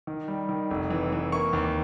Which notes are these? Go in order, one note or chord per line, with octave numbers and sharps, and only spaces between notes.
D#3
G3
D#3
F1
E3
E3
A#3 C#6
D#2